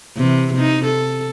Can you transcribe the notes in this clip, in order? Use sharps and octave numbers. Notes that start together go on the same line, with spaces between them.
C3 E3
C3 D#4
A4